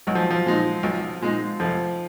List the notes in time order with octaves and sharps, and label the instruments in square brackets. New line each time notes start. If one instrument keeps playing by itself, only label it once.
[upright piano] B1 [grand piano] F#3
[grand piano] F3
F3
[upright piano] A#2 G#3 D#4
B1
A#2 G#3 D#4
[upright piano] F1 [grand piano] F3